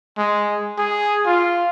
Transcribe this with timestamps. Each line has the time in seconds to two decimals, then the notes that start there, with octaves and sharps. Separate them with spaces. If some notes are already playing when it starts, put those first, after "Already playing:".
0.18 G#3
0.78 G#4
1.26 F4